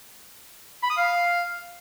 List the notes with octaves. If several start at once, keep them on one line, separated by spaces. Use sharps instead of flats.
B5
D#6
F5